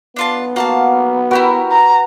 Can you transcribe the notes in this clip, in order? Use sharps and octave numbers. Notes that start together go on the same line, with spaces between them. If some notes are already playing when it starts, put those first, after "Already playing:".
B3 D4 F4 A5
A#3 F#4 F5 A5
E4 F#4 G4 A#4 B4
A#5